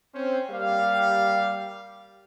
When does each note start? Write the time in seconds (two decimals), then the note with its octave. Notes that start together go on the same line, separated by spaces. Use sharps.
0.14 C4 C#4 C5
0.50 G3 A#3 G4 F5